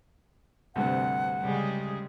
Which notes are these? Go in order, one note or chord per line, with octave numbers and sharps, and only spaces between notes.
D2 G2 C3 F#5
C#3 G3 G#3 G#4